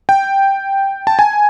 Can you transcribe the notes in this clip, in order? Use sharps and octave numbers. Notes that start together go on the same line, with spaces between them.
G5
A5
G#5